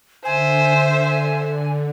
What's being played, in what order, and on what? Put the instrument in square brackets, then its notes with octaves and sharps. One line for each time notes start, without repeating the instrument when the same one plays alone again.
[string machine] D3 [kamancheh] C5 E5 [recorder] G#5